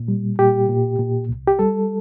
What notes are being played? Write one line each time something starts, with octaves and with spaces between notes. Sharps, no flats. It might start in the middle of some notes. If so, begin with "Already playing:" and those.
Already playing: A#2
G3
A#2 G4
A#2
A#2
C2
G4
G3 A4